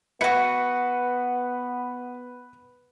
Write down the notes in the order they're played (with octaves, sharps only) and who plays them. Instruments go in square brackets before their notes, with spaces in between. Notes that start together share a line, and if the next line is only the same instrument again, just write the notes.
[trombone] B3 [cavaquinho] E4 F#4 [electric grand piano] B4 C#7